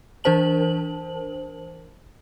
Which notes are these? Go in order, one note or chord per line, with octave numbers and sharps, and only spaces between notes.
E3 D4 A#4 C5 A5 F#7